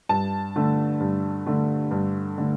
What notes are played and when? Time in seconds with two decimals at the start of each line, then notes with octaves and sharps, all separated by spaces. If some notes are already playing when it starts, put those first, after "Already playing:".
0.09 G2 A5
0.56 D3 A3
1.00 G2
1.46 D3 A3
1.91 G2
2.38 D3 A3